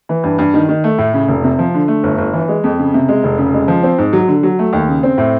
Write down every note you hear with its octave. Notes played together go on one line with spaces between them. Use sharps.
E3
G2
G2
D#3
D#3
A3
A2
C#3
F1
C3
F3
D3
A3
G1
G1
E3
G#3
F2
C#3
C3
G#3
F1
C#3
G#3
F3
C4
G#2
F#3
D3
F#3
A3
D#2
C#3
C4
A2